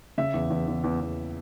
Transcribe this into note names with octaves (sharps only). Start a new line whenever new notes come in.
C#3 E5
E2
E2
E2
E2
E2